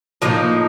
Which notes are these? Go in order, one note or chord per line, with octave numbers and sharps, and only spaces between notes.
A2 F3 A#3 D#4